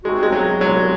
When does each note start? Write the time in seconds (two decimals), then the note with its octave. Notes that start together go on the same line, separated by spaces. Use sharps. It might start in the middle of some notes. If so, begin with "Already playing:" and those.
0.04 C3 F3 G#3 C4 D#4 F#4
0.23 G#3
0.32 F#3
0.61 C2 A#2 F#3 G#3